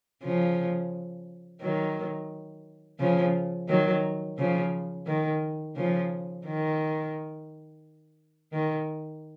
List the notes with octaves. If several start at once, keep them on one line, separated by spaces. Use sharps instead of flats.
C#3 F3
D#3 F#3
C#3 F3
D#3 F#3
C#3 F3
D#3
C#3 F3
D#3
D#3